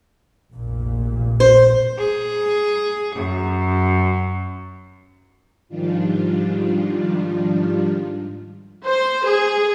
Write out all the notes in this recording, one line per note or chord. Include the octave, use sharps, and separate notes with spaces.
F1 A#1 A#2
C5
G#4
F#2
G#2 D#3 F3 G3 D4 F4
C5
G#4